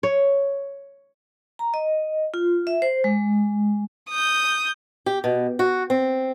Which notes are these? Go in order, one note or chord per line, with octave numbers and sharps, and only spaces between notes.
C#5
A#5
D#5
F4
E5
C5
G#3
D#6 G6
G4
B2
F#4
C4